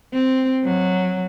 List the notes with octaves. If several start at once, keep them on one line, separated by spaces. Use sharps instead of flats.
C4
F#3